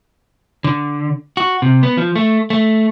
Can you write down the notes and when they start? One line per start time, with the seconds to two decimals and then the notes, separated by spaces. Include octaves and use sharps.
0.64 D3
1.37 F#4
1.62 C3
1.83 B3
1.97 F3
2.16 A3
2.50 A3